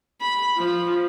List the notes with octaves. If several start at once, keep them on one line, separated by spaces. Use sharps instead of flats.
B5
F3